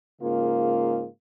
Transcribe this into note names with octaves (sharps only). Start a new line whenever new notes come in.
G#2 C#3 A#3 F4